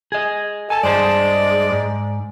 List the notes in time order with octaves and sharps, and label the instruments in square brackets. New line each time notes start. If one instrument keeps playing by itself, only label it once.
[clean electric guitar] G#4 D#5
[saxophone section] A4 [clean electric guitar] G#5 A5
[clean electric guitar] G2 C5 A5 [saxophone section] G#3 D5
[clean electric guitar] G#2